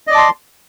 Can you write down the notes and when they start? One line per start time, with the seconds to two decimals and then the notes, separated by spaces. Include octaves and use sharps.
0.07 D#5
0.10 D5
0.12 D6
0.15 A5
0.17 C6